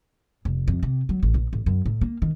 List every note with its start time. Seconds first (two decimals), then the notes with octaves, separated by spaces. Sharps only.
0.45 F1
0.68 F2
0.83 C3
1.09 F#3
1.23 A1
1.34 A#1
1.53 A1
1.66 F#2
1.86 A2
2.01 A#3
2.22 D#3